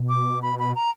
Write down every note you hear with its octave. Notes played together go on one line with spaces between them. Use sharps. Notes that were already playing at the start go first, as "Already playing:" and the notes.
Already playing: B2
D6
B5
B5
A#5